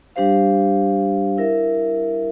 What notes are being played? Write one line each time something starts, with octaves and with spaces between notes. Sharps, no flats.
G3 D4 G4 C5 F5
E4 A#4 E5